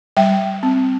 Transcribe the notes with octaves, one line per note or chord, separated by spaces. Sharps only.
G3 E5 G5
C4